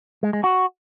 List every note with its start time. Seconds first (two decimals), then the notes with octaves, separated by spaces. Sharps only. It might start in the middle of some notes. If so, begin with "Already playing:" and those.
0.23 G#3
0.33 G#3
0.44 F#4